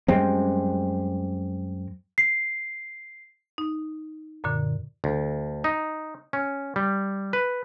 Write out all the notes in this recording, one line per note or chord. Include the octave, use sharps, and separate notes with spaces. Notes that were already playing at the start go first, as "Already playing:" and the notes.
F#2 G3 G#3 C4
C7
D#4
F#2 A#2 D3
D2
D#4
C#4
G3
B4